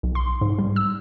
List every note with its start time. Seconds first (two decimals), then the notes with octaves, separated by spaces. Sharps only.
0.03 B1
0.15 C6
0.41 G#2
0.59 G3
0.76 E6